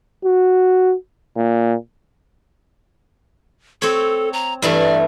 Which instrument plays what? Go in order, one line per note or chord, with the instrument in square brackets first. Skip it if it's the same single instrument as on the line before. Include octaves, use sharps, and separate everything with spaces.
[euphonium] F#4
A#2
[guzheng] C4 C#5 [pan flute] A4
[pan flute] A#5
[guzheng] G2 E3 A3 [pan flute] D5